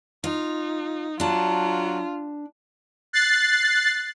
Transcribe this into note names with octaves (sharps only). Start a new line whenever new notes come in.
D#4 F4
F#3 D4 F4 A5
F#6 A6 C7